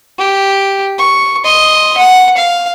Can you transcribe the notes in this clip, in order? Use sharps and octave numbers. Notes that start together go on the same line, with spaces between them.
G4
C#6
D#5 C6
F#5
F5